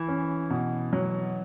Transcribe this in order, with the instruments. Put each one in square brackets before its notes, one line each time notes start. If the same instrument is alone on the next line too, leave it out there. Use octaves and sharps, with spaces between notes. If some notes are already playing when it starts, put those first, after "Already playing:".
Already playing: [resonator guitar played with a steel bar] E3
[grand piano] C#4
B2
F#3